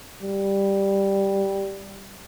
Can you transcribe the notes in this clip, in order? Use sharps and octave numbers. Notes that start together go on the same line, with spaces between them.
G3